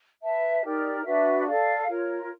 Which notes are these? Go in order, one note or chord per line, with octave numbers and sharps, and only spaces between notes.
B4 E5 A5
D#4 G4 A#4 D5
D4 F#4 B4 E5
A4 D5 F5
F4 A#4 C#5